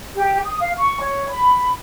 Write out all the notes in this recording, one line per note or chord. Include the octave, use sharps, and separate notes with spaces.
G4
D#6
F5
C#6
C#5
B5